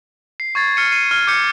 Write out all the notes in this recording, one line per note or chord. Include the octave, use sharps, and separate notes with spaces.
C7
C#6 G#6 A6 C7
F6 C7 C#7 D#7
C7 C#7 D#7
C#6 F6 G#6
D6 G6 C#7